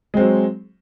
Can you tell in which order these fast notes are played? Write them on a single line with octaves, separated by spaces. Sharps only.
G#3 C4 F#3